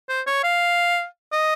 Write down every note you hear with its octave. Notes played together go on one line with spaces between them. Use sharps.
C5
C#5
F5
D#5